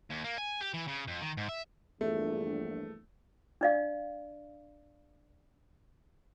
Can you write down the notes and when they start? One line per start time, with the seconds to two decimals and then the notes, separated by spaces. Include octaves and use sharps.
0.10 D#2
0.24 A#3
0.38 G#5
0.61 G4
0.74 E3
0.88 C#3
1.07 F2
1.22 D#3
1.37 G#2
1.49 E5
2.01 A#1 E2 G2 A3
3.61 D4 D5 F5